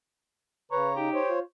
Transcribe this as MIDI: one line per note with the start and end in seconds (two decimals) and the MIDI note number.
0.72 1.09 49
0.72 0.89 71
0.72 0.92 73
0.72 1.09 82
0.96 1.20 63
0.96 1.30 67
1.14 1.39 72
1.14 1.39 73
1.28 1.42 65